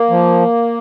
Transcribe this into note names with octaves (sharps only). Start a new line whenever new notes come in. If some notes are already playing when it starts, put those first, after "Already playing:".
Already playing: A#3
F3